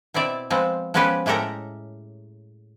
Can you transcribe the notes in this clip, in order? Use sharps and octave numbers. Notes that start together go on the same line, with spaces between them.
B2 C4 E4 D5 E5
F3 G#3 B3 C4
F3 G#3 B3 C#4 G4 B4
A2 G#3 G4 A4 A#4 A#5